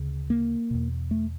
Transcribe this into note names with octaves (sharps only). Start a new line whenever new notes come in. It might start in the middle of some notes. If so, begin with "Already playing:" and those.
Already playing: D2 C#3
A#3
E2 B2
A3